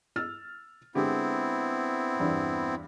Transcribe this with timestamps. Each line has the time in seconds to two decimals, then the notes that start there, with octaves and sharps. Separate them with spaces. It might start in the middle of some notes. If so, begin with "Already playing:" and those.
0.16 E6 F6 A6
0.95 D3 G#3 B3 C4 E4 G4
2.20 E2 G2